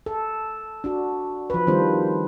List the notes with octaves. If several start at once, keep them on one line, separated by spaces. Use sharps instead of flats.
A4
D4 F#4
F3 B4
D#3 G3 C4 D4 F4 C5